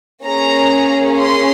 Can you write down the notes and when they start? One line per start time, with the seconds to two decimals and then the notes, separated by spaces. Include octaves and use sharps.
0.24 A#3 C#4 G#4 A#5
1.19 C6